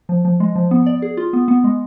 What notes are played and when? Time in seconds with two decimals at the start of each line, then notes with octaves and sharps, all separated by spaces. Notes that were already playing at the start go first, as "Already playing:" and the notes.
0.09 F3
0.25 F3
0.40 G#3
0.55 F3
0.71 B3
0.86 D5
1.02 G#4
1.17 F4
1.33 B3
1.48 B3
1.64 G#3